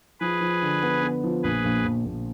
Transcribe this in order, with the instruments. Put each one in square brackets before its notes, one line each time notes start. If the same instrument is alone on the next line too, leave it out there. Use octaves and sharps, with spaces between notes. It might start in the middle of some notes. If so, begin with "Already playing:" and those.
[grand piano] F3 [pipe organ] G#4 B4
[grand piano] F3
D3
B3
B3
F3
[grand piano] A#1 [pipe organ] G#4 B4
[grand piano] A#1
A#1
A#1